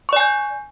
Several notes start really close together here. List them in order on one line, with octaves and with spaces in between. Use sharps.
C#6 D5 G#5 G6